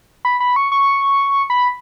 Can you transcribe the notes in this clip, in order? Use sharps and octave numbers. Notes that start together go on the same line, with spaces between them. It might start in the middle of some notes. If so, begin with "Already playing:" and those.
B5
B5
C#6
C#6
B5